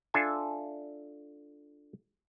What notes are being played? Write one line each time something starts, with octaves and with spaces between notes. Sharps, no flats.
D4 F4 A4 E5 G#5